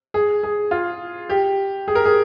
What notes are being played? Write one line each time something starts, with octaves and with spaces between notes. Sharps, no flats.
G#4
G#4
F4
G4
G#4
A#4
G#4